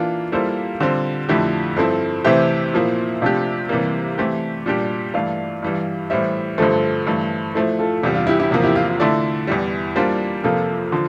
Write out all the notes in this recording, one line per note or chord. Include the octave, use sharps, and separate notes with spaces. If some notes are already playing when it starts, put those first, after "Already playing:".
Already playing: E3 A#3 D4 F4
G3 A#3 E4 A4 C5
D3 G3 C4 F4
F2 D3 A3 E4 G4
G2 F3 C4 E4 A4 C5
C3 E3 A3 C4 G4 C5 E5
A#2 F3 A#3 E4
C3 F3 A3 D4 G4 D5 F5
C3 E3 G3 A#3
E3 A3 C4 G4
A#2 G3 D4 G4
G2 E3 A3 D5 F5
G2 E3 G3
A2 E3 G3 C5 E5
G2 D3 F3 A3 A4 C5
G2 E3 A3
F3 A3 E4 A4 C5
F4 A4
E2 C3 G3 F4
F4
E4 G4
E4 G4
E2 C3 F3 A#3
E4 G4
F4
F4
D3 A3 E4 F4 A4 D5
E2 E3 G3 E4 G4
G3 A#3 D4 F4 C5
F2 C3 F3 A#3 F4 A4
D3 F3